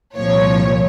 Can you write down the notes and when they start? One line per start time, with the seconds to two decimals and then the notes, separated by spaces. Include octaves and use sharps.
0.16 C2 A#2 F3 C#5